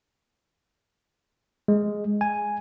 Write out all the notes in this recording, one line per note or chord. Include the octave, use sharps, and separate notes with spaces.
G#3
G#5